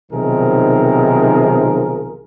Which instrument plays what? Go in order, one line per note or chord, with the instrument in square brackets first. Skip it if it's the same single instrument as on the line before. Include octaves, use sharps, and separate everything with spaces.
[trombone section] B1 C3 D#3 F3 G#4 A#4